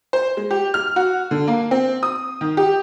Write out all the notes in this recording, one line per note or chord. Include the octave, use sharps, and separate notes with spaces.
C5
G#3
G4
F6
F#4
D3
A#3
C4
D#6
D#3
G4